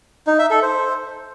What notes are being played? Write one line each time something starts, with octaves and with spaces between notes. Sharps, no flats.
D#4
E5
A4
C5